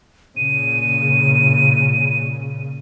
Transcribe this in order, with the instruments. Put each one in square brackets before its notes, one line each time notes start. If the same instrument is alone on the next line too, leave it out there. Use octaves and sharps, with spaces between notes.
[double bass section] A#2 C#3 [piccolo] D#7